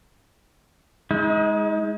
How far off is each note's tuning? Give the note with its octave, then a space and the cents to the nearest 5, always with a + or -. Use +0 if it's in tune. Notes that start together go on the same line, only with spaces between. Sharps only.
G#3 +0 D#4 +35